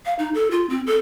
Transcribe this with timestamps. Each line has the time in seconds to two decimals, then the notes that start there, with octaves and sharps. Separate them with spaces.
0.06 F5
0.19 D#4
0.35 A4
0.51 F4
0.70 C4
0.87 A4